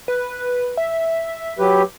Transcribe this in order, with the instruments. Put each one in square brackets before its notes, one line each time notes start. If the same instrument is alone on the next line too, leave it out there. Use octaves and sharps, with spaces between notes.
[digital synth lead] B4
E5
[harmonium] F#3 G4 B4